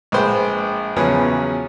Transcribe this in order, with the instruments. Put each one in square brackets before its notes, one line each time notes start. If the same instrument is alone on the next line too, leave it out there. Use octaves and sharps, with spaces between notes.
[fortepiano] A#1 G#3 B4 C5 G5
E2 C#3 F3 F#3 B4 C#5